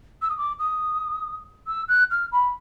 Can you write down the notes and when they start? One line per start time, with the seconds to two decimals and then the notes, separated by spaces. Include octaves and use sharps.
0.22 E6
0.29 D#6
0.37 D6
0.59 D#6
1.67 E6
1.88 F#6
2.11 F6
2.32 B5